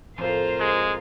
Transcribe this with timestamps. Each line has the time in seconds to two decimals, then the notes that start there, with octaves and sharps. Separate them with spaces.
0.18 F2 A2 F4 A#4 C5 F5 G#5
0.60 G#3